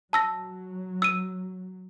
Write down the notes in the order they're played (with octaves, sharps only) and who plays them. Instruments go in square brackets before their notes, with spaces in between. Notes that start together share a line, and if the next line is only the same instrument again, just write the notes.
[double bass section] F#3 [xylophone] A5 E6 A#6
[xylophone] E6 D#7